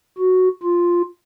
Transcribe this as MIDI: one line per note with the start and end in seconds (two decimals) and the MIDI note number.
0.18 0.48 66
0.63 1.02 65